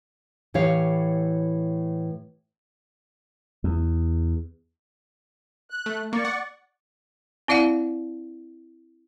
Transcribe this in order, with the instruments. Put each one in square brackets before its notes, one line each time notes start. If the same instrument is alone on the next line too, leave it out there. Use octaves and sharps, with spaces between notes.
[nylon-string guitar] A2 E3 G4 C#5 F5
[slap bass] E2
[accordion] F#6
[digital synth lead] A3
[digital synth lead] A#3 [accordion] D5 C#6
[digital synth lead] F#5
[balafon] C4 E4 D5 F5 F#5